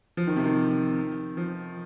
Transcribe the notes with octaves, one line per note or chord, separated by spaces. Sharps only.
F3
D#3
C3
D#3
F3